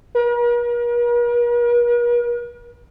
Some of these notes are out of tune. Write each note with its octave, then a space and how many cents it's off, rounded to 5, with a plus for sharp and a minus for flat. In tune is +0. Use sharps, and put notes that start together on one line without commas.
A#4 +45